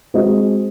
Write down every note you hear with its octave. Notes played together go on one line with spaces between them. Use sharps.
G#3 C4 F#4 C5 D#5